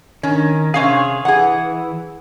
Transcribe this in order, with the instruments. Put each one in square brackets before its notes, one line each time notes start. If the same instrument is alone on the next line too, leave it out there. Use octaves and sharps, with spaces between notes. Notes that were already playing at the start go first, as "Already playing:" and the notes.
[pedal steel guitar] D#3 [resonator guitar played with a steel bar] C#4
[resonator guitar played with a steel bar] C3 C#4 F5 [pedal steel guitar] G#4 C#5
[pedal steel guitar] E3 [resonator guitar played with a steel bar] G#4 F#5